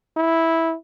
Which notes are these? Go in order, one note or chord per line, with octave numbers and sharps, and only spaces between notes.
E4